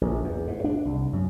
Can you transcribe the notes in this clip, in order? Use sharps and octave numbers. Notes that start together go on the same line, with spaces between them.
A#1
E2
G#2
D4
C2
F#2